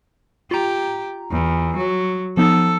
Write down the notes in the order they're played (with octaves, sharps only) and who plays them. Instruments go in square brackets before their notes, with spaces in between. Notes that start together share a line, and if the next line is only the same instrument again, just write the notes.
[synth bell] F4 A#5 [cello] G4
[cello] E2
F#3
[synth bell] F3 B3 D#4 [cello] A4